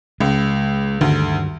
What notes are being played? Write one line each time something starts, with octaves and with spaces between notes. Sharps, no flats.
C#2 G#3
D2 G2 D#3